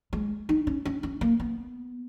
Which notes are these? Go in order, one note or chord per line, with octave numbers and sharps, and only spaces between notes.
G#3
D#4
C#4
C#4
C#4
A#3
B3